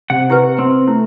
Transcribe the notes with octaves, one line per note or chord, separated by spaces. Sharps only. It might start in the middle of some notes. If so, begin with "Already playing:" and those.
C3 F#5
E4 G4 B4
C4
A3 E4